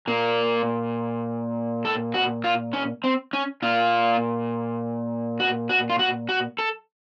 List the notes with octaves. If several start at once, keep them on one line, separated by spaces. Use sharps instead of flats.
A#2 A#3
A4
F#4
F4
C#4
C4
C#4
A#2 F4
F#4
F#4
F4
F#4
F#4
A4